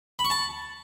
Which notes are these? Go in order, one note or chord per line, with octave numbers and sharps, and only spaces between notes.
B5
C#6
A5